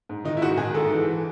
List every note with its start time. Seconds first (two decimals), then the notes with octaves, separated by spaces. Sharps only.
0.09 G#2
0.25 D#3 D#4
0.37 E4
0.42 G#2 F#4
0.57 D#3 G#4
0.74 G#2 A4
0.91 E3